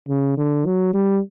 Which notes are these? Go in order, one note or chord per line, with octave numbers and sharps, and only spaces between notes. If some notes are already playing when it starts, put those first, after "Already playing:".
C#3
D3
F#3
G3